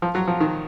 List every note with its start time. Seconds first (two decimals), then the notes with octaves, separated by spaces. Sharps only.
0.02 F3
0.15 F#3
0.28 F3
0.40 D#3